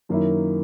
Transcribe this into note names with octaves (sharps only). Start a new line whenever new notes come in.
F#2 D#3 A#3 E4